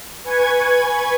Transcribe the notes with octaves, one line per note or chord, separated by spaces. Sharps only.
B4 G#5 C#6 G#6